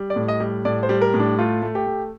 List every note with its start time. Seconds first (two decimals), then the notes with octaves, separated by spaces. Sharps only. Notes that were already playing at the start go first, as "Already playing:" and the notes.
Already playing: G3
0.10 D5
0.16 A2
0.28 D#5
0.40 G3
0.65 A2 D5
0.83 C5
0.89 G3
1.02 A#4
1.14 A2
1.20 D4
1.39 A3 F4
1.62 A3
1.75 G4
1.86 A3